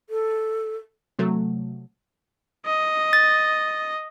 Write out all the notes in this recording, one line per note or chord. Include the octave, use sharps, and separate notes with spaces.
A4
C3 F#3 A3
D#5
A6